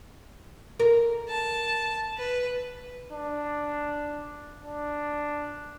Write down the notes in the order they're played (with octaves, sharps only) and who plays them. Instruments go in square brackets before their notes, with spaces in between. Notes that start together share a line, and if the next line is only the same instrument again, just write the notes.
[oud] A#4
[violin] A5
B4
[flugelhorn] D4
D4